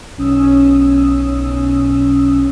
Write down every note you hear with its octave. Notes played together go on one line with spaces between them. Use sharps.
B1 C#4 D#6 E6